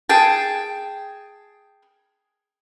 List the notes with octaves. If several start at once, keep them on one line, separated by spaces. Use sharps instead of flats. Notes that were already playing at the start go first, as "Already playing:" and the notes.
G#4 G5 A5